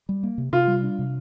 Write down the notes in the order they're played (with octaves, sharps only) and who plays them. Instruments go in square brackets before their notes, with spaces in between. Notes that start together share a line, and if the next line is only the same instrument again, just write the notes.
[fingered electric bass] G3
A#3
C3
[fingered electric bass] C3 [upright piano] F4
[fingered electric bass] G3
D4
C3